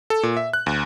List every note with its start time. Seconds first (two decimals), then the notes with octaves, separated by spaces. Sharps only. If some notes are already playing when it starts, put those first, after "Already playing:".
0.10 A4
0.23 A#2
0.37 E5
0.54 F#6
0.66 D2